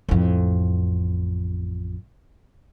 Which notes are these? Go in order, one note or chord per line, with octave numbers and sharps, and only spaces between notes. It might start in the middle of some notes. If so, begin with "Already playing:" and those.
A1 F2